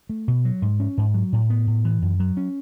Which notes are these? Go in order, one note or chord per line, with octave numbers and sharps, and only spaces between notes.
A3
B2
F#3
G#2
C#4
G#2
F#3
A2
B3
A2
E3
F#2
F#3
C#4